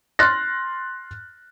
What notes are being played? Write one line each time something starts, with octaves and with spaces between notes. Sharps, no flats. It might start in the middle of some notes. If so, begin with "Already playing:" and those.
C6 F6 F#6 A6 A#6